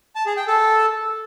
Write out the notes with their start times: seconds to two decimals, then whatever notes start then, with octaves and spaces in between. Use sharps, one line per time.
0.15 A5
0.26 G#4
0.37 G5
0.47 A4